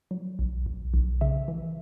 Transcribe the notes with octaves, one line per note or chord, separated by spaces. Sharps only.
F#3
B1
B1
B1
C#3 E5
E3